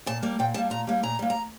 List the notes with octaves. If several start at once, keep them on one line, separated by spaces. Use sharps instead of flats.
A#2 A5
G3 A#3
A#2 G5
G3 A#3 A5
A#2 A#5
G3 A#3
A#2 A#5
G3 A#3
A#5